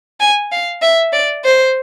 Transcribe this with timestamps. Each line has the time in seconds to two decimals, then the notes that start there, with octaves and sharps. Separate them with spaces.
0.20 G#5
0.52 F5
0.82 E5
1.13 D5
1.44 C5